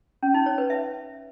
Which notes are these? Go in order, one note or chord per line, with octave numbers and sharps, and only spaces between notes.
C#4
D#4
C#5
B4
E5